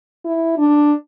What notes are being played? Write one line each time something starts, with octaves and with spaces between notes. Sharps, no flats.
E4
D4